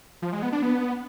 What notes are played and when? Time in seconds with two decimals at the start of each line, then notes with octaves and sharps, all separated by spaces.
0.22 F3
0.32 G#3
0.42 B3
0.52 D4
0.62 B3